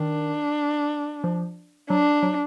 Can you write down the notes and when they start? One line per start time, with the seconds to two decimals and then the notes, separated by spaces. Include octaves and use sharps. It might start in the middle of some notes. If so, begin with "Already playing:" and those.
Already playing: D#3 D4
1.24 F3
1.90 F#3 D4
2.23 F#3